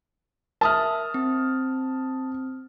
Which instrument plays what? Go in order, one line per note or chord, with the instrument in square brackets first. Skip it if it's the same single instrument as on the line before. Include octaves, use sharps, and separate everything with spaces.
[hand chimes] A#4 E5 [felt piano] A5 D#6 F6
[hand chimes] C4